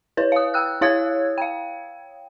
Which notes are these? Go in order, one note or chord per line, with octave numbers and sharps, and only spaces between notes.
E4 B4 C#5
F5 D#6
G5 E6 F#6
E4 C#5 F5 D#6 G#6
F5 G5